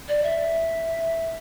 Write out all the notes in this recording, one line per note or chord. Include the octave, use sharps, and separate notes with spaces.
D5
E5